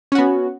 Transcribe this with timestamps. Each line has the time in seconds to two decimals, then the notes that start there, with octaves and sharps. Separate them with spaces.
0.12 C#4
0.15 F#4
0.18 B3